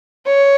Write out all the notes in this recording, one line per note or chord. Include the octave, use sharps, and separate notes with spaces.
C#5